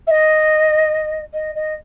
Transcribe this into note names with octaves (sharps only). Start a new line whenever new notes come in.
E5
D#5
D#5
D#5